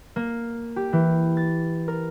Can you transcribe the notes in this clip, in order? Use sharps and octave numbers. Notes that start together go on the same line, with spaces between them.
A#3
G4
E3
A6
A#4